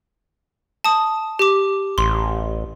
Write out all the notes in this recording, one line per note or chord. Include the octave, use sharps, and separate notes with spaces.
A5 D#6
G4 D6
A1 C6